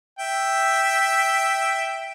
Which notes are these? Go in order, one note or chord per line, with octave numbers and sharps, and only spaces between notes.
E5 G5